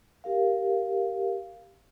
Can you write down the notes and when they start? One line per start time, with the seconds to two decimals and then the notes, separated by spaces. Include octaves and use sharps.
0.24 G4 A#4 F5